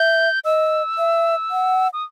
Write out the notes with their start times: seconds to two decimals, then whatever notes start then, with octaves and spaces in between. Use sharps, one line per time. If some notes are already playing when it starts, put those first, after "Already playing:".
Already playing: E5 G6
0.45 D#5 E6
0.98 E5
1.51 F#5
1.93 D#6